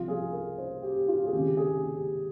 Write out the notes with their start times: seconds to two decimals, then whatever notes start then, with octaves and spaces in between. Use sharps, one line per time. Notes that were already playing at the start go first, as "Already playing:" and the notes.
Already playing: C2 C3 F3 F4
0.08 G#4
0.33 A#4
0.58 C5
0.82 G4
1.08 F4
1.25 G#4
1.33 C#2 C3 D#3 G4
1.57 G#4
1.83 G4